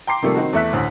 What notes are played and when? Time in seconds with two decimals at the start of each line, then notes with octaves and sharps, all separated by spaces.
0.07 G5 A#5 C6 D6 C7
0.22 C3 D#3 F3 G3 A3 A#3
0.36 D#3 C4 D#4 F#4
0.53 E2 A3 E5 F#6 B6
0.72 A1 D2 C5